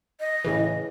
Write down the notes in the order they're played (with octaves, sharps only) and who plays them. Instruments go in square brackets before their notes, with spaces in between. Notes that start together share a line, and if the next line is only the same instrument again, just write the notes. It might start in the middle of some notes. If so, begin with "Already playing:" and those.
[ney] D#5
[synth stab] A2 C#3 E3